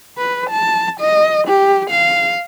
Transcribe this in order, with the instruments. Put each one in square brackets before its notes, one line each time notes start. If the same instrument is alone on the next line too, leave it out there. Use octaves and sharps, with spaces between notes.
[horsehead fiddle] B4
A5
D#5
G4
F5